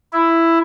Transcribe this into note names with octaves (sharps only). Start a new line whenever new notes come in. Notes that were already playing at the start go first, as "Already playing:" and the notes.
E4